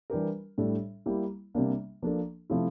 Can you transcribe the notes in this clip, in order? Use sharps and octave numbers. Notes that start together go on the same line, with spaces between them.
E3 G3 D4 G4 A#4
A2 G3 D4 A4
G3 A#3 E4 G4
C3 G3 A#3 D4
F3 A#3 D4 A4
C3 F3 A3 E4